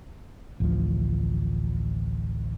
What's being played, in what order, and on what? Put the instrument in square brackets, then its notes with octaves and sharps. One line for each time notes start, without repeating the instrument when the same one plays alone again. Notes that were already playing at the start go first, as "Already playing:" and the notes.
[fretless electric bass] A1 D2 F3